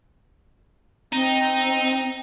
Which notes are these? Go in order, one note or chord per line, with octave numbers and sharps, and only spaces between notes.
C4 D#4